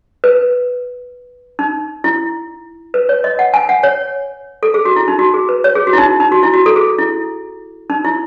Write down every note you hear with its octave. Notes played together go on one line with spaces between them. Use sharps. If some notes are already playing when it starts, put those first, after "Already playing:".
B4
D#4
E4
B4
C#5
D#5
F#5
G#5
F#5
C#5
A4
G#4
F#4
E4
D#4
F#4
G#4
B4
C#5
G#4
F#4
E4
D#4
D#4
F#4
E4
F#4
A4
G#4
E4
D#4
E4